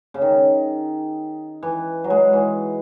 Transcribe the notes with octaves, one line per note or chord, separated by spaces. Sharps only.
C#3
D#3
E3
F#3
G#3
E3